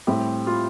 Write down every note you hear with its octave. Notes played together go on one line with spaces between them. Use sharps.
A2 G3 C4 E4 G4
F4